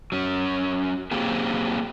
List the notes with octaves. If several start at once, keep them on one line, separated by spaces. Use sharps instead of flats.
F#3 C#4
F#3 A#3 C4 G4 G#4